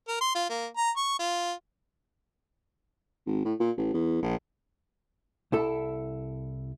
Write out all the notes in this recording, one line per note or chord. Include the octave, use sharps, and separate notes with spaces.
A#4
C6
F4
A#3
A#5
C#6
F4
G#1
A2
A#2
A1
E2
A#1
C2 E4 A4